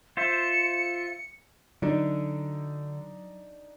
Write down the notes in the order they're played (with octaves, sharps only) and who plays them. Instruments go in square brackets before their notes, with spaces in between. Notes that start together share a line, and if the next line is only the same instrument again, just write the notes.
[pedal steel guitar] F4 C5 E5 [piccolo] C#7
[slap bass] D3 [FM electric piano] F#3 [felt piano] D4 D#4